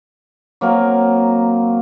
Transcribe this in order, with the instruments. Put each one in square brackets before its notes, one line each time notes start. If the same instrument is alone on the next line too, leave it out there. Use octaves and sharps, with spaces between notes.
[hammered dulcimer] F#3 A#3 C4 A#4